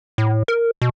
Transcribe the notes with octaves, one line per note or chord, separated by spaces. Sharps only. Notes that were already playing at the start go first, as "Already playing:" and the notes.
A2
A#4
B2